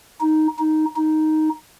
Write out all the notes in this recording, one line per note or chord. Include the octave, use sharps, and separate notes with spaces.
D#4
D#4
D#4